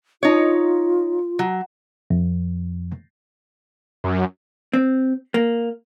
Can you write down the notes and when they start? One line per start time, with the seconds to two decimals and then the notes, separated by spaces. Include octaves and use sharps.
0.23 D#4 F4 C#5
1.39 F#3
2.10 F2
4.04 F#2
4.73 C4
5.34 A#3